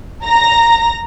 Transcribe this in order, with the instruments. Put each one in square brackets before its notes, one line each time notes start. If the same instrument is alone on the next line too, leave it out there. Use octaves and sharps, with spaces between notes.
[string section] A#5 A#6